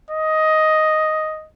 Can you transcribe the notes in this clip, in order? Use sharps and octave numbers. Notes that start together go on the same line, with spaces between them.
D#5